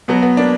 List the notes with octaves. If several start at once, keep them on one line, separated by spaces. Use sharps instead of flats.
B2 F#3 B3
B3
A#3 D4